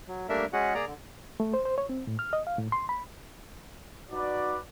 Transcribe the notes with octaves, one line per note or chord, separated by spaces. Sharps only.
F#3
G3 A3 A#3 D4 A#4 E5
G#3 C#4 F#4 G#4 F#5
A#3 G#4 D5 A#5
D3
A3
C5
C5
C#5
C4
A2
F6
D#5
F5
A2
C6
B5
D#4 F#4 B4 D5